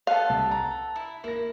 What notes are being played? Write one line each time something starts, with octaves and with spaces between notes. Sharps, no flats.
B3 A4 F5
C2
A#5
E4
A#3 E4 A#6